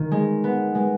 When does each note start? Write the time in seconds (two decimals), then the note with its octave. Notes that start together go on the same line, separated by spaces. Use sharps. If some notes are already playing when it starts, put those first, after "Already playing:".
Already playing: D#3
0.11 G#3
0.44 B3
0.75 G#3